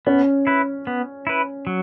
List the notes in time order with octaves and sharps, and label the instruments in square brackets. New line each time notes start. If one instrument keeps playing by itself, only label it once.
[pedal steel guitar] B3 [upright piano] C#4
[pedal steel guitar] E4 B4
B3
E4 B4
F#3